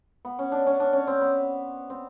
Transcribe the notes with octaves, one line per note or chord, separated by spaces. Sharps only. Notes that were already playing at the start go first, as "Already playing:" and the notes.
B3
C#4
D4
C#4
D4
C#4
C4
B3
C4